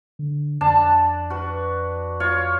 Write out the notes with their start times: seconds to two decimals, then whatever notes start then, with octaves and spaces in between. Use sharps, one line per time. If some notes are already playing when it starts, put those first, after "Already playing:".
0.19 D3
0.61 F2 D4 A5
1.30 F#4 B4
2.20 F4 C#5